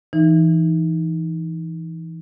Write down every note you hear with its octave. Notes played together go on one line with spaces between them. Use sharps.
E3 D#4